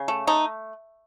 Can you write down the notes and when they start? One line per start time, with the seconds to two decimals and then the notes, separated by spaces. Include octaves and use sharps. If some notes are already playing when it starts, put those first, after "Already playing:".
Already playing: C#3
0.08 A3
0.27 A3 D#4